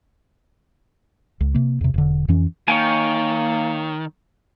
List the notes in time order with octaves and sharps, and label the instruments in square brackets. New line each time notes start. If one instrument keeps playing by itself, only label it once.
[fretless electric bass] C#2
C3 A#3
E2 C3
E1 D3
F2 E3 C#4
[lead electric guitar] D#3 [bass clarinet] A#3 [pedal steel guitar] C#5 G5 G#5